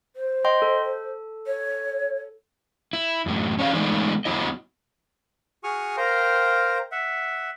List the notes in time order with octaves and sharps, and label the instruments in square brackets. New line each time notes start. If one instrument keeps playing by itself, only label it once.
[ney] C5
[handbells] D#5 G5 C6
A4
[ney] C#5
[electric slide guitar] E4
F#2 A2 F#3
C#4 C#5 D5 F5
E3 G#3 A3 B3 D#4 D5
F#3 B3 E4 D#5
[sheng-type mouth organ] F#4 G#4 C#6 D#6 F6
A#4 C5 F5 G5 A#5
E5 F#5